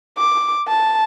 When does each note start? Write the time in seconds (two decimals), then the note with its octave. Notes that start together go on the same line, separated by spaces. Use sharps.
0.18 D6
0.68 A5